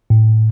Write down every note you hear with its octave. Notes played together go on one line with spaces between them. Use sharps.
A2